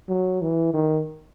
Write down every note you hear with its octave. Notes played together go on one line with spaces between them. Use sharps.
F#3
E3
D#3